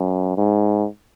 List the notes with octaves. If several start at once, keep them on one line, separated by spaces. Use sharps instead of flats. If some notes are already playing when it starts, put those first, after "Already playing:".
Already playing: F#2
G#2